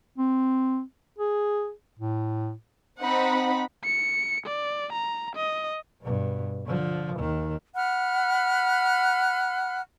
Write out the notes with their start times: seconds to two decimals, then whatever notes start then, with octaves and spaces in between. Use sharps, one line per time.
0.18 C4
1.19 G#4
1.99 A2
3.01 C4 D#4 F#5 B5
3.84 C#7
4.47 D5
4.93 A#5
5.36 D#5
6.02 G2 B2
6.66 D3 F3
7.16 D#2 D#3
7.76 F#5 B5 F6 F#6